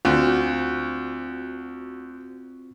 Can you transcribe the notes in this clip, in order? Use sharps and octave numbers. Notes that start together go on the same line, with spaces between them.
D2 C4 F4 F#4